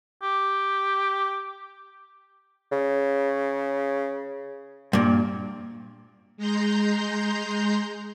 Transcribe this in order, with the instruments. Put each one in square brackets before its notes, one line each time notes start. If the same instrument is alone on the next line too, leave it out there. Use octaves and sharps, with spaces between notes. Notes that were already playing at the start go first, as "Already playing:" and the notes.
[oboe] G4
[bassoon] C#3
[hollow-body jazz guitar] G2 A#2
[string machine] G#3 A#5 C6 G6